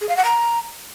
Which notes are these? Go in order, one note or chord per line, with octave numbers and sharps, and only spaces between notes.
G#4
F5
F#5
A#5